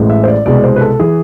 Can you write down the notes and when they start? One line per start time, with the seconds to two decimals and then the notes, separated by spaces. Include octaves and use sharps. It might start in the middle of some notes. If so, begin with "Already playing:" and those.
Already playing: A1 A2 G#3
0.10 E5
0.23 C5
0.28 D5
0.46 C2 B2 G#3 D5
0.64 C5
0.76 B4
0.81 A4
1.00 E3 G#4